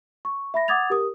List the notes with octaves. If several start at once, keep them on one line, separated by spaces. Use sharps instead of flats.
C#6
E5 B5 A#6
F#5 D6 D#6 G#6 A6 F7
G4 A#4 D#6